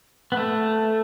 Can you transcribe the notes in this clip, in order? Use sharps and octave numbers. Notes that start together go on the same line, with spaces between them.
B3
A3